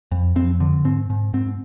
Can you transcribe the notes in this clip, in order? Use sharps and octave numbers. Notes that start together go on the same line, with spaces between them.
F2
F2 C4
D3
G#2 C4
G#2
G#2 C4